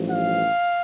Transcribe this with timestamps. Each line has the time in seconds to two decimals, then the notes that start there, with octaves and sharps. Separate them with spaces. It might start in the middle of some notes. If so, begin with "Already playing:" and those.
Already playing: A1 G2 F3
0.09 F5